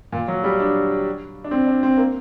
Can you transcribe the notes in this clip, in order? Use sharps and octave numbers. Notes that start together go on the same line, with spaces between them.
A#2
F#3
G3
D4
D4
C4
D4
C4
A#3